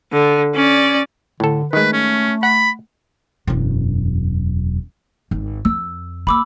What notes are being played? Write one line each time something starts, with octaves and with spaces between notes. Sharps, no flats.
D3
C#4 D5
A2 D3 A4
D#3 G#3 A3 B4
C#4
F#5 B5
E1 F#2
G#1
F2 E6
A#3 B5 D6 E6